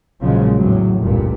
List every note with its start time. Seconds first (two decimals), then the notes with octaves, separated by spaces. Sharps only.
0.21 A#1 A#2 C#3 F3 F#3 G#3
0.55 E2 A2 F#3
1.00 F1 C#2 G2 A#2